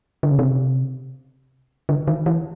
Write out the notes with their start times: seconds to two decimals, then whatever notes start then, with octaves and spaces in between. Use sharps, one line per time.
0.23 D3
0.31 C#3
0.39 C3
1.89 D3
2.08 D#3
2.26 E3